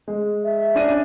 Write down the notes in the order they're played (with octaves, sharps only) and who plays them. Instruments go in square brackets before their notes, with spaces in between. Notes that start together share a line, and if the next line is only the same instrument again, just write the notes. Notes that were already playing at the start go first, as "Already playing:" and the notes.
[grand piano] G#3
[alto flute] E5
[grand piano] C#4 D4 D#7